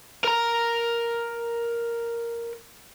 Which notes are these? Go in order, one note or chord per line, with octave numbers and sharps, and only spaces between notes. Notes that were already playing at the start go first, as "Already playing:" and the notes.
A#4 A#5